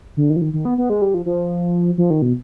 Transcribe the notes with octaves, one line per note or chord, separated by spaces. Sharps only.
D3
D#3
F3
D#3
D#3
B3
B3
G#3
G3
F3
F3
F3
D#3
B2